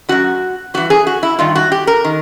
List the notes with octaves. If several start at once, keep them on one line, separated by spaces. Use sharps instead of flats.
F#2 D#3 F#4
G2 E3 F#4
G#4
F#4
E4
G2 D#3 F4
F#4
G4
A#4
D#3